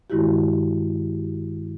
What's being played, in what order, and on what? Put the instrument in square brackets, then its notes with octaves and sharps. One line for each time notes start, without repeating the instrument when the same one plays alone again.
[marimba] G2 D#3 G#3 E4 F#4 G4